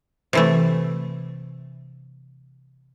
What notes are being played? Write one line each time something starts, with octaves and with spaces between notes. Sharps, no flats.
C3 E3 A3